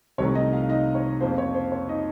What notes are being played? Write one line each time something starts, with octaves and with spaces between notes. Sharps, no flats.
C2 C3 D#3 A3 C#5
D#4 D#5
F4 F5
D#4 D#5
C#5
F2 C#3 F3 A#3 C5
C#5
C5
C#5
D#4 D#5